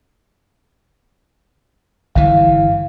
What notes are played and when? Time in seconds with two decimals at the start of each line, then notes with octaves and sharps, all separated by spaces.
2.15 G1 E3 F5